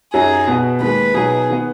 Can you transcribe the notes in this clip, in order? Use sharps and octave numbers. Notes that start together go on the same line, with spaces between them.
F#2 F#3 D#4 G#4
B2 B3 F#4
D#2 D#3 G#3 B4
B2 F#3 B3 D#4 G#4
D#3 B3